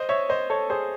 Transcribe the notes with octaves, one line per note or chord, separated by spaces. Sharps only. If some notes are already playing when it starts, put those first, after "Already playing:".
Already playing: C5 D#5
C#5 E5
C5 D#5
A4 C#5
G#4 C5